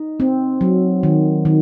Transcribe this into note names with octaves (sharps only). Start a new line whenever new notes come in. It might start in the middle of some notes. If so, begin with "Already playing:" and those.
Already playing: D#4
C4
F#3
D#3
D#3